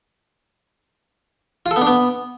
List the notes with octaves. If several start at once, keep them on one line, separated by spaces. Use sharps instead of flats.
F4
A4
B3
D4
B3